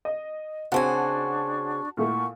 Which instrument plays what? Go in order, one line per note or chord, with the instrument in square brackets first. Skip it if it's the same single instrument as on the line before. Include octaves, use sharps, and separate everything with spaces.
[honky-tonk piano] D#5
[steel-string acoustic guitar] C#3 C4 G#5 [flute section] D4 C#6 [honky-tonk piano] F#4 F#5 A5
[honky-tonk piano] A#2 A3 E4 [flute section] F#5 C#6